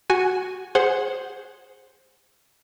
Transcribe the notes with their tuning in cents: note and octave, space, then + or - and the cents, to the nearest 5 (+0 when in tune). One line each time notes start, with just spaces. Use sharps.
F#4 +0 G#5 +5
G#4 +0 C5 +0 F#5 +0